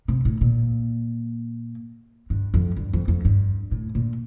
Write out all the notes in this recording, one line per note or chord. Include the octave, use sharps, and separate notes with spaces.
C3
A2
A#2
G2
F2
G2
F2
F2
G2
A2
A#2